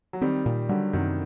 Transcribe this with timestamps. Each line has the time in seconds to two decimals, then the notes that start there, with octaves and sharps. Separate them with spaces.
0.13 F#3
0.22 D#3 G3 C4
0.46 A#2
0.69 D3 F#3 G3
0.93 F#2 C3 D#3